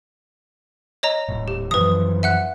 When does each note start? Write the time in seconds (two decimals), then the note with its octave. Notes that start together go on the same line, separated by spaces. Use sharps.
1.03 C#5 D#5 A#5
1.28 D#1 A2
1.48 G4
1.71 F#2 E3 F3 B4 D#6
2.23 E5 F#5 F#6